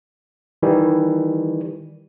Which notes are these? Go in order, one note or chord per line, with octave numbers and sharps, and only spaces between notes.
D#3 E3 G3